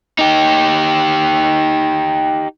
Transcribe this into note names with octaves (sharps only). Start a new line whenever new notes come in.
D#4 G4